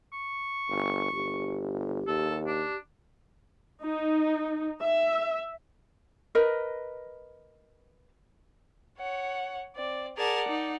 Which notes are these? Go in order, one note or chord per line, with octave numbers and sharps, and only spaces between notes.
C#6
G1
G1 G4
D#2 A4
D4
D#4
E5
A#4 B4 D#5
C#5 F#5
C4 D5
G#4 A#4 D5 F#5 A5
D#4